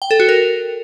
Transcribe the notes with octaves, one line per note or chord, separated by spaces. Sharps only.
G5
A4
F#4
A#4